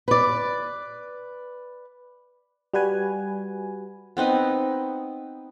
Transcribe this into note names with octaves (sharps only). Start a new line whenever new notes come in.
B4 D5
G3 F#4 B4 G#5
B3 C4 D#4 B4